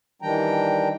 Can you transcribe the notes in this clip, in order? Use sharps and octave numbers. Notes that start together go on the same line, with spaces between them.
D#3 E3 G3 D4 G5 A#5